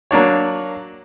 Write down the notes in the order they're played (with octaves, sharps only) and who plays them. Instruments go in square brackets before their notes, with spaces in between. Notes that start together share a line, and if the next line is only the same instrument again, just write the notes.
[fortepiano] F#3 A#3 D4 C#5